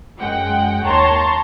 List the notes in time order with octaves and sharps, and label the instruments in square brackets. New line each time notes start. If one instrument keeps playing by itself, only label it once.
[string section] F#2 G#3 F#5 G5
D#2 C#5 A5 A#5 C6